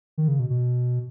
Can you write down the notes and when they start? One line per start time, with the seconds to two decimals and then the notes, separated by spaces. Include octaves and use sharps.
0.18 D#3
0.28 C#3
0.39 B2
0.50 B2